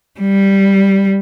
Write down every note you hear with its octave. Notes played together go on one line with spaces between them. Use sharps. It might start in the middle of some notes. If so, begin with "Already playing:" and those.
G3